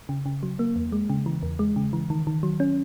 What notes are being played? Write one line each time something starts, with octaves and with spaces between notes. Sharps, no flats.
C#3
C#3
F#3
A#3
E2
G#3
C#3
E3
E2
G#3
C#3
E3
D#3
D#3
F#3
C#4